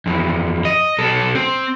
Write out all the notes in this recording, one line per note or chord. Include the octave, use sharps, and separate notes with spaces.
F2 E3
D#5
B1 A4
C4